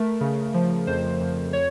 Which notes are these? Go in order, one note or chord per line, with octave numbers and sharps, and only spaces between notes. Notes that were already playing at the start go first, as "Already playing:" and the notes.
Already playing: A3 A#4
C#3
F3
F2 C5
F2
C#5